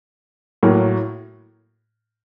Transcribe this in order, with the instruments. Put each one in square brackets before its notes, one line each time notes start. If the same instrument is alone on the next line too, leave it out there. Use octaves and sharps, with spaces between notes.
[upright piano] A2 F#3 A#3